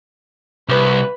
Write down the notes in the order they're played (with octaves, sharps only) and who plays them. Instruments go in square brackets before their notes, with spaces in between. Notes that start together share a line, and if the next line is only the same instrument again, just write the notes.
[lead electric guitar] C2 [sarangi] B4